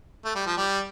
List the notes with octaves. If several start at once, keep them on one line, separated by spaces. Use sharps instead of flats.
A3
G3
F3
G3